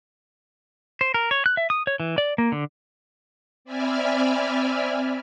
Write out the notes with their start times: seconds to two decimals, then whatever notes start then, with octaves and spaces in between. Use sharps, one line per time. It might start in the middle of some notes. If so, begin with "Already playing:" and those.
1.01 C5
1.14 A#4
1.31 C#5
1.46 F#6
1.57 E5
1.70 D#6
1.87 C#5
2.00 E3
2.18 D5
2.38 A#3
2.52 D3
3.65 C4 D5 E5 G#5 B5 F6